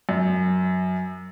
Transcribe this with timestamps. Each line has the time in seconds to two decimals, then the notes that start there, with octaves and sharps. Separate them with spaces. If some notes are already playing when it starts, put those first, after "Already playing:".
0.09 F#2